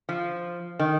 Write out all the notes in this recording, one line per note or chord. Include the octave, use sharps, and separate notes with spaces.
F3
D#3